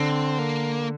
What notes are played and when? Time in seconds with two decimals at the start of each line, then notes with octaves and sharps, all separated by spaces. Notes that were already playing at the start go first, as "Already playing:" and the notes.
Already playing: D3 C4
0.39 A#3